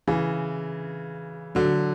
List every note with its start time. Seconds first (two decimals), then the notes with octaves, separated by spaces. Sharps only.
0.07 C#3 E3
1.55 D3 F#3